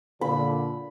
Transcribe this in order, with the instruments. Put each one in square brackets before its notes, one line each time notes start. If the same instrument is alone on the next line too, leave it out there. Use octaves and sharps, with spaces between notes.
[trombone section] A#2 D3 [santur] B5